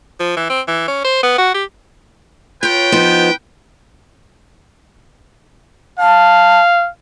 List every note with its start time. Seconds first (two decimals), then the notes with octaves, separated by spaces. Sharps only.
0.20 F3
0.37 E3
0.50 C4
0.68 E3
0.88 C#4
1.05 C5
1.23 B3
1.38 F#4
1.54 G4
2.63 F4 B4 C#5 G5
2.92 F3 B3 D#4
5.99 F5 A5